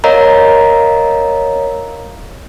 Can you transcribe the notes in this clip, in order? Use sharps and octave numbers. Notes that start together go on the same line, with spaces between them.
A#4 C#5 D#5 F5 A#5